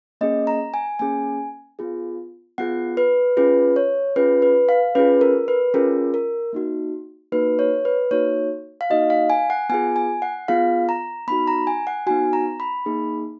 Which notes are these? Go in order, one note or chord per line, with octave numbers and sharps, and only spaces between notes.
A#3 C#4 G#4 D#5
A#5
G#5
A#3 C#4 G#4 G#5
B3 F4 G#4
B3 F4 G#4 F#5
B4
C#4 F4 G#4 B4
C#5
C#4 F4 G#4 B4
B4
F5
C#4 F4 G#4 B4
A#4
B4
C#4 F4 G#4 A#4
A#4
A#3 D#4 F#4
A#3 D#4 F#4 B4
C#5
B4
A#3 D#4 F#4 C#5
F5
A#3 D#4 F#4 D#5
F5
G#5
F#5
B3 F4 G#4 G#5
G#5
F#5
B3 F4 G#4 F5
A#5
B3 D#4 F#4 B5
A#5
G#5
F#5
B3 D#4 F#4 G#5
A#5
B5
A#3 D#4 G#4